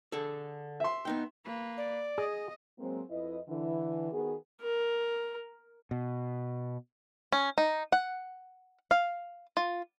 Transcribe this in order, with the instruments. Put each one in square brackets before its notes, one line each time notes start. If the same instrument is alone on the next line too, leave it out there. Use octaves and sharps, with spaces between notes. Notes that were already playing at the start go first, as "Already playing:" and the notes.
[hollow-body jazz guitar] D3 G#4 A4
[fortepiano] E5 C6
[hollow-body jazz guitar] B3 D#4 G5
[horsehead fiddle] A#3 B4
[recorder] D5
[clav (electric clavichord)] G#4 [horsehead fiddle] D#5
[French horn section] F#3 G#3 A#3 C4
F2 E4 B4 D#5
D3 E3
D#3 B3 F#4 G#4
[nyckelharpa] A#4
[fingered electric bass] B2
[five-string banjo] C#4
D#4
F#5
F5
F4